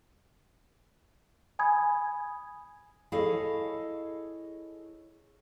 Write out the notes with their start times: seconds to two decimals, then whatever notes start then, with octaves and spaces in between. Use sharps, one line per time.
1.59 G#5 B5 D#6 G#6
3.12 E4 G#4 A4 C#5 D#5 F5